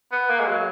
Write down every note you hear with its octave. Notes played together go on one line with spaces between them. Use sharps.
B3
A#3
G#3
F#3